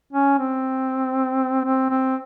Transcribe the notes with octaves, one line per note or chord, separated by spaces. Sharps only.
C#4
C4
C4
C4